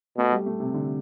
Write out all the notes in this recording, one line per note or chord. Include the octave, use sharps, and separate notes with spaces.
B2 A3
G3
A3
C3
D3